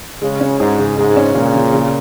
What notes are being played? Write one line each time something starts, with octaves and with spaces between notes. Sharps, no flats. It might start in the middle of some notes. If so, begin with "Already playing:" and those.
C#3 G#3
C#4
G#2 G#4
C#3
G#2 G#3
C#4
A#2 C#3
C#3
C#3